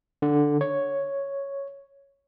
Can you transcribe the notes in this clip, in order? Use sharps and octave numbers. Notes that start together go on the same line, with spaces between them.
D3
C#5